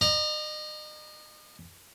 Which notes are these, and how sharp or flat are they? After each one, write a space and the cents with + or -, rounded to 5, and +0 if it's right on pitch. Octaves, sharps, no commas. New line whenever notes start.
D#5 -40 A#5 +10